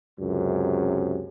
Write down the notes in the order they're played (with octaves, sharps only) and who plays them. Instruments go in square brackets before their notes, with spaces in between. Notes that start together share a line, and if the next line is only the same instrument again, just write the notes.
[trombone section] C#2 F#2 C3